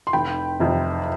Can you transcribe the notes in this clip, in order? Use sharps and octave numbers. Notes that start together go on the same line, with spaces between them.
C6
F1 G5 B5
F2 C3